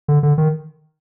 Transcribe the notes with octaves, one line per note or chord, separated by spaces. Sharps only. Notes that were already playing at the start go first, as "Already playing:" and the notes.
D3
D3
D#3